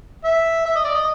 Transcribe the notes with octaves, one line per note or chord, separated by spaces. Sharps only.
E5
E5
D#5
D5
D#5